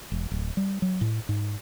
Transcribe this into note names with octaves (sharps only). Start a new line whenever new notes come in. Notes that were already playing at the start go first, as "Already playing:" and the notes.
E1
D1
G3
F#3
A2
G#2